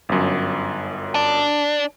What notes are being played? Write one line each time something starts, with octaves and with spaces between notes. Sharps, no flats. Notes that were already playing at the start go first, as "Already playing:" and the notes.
G1 F#2
D4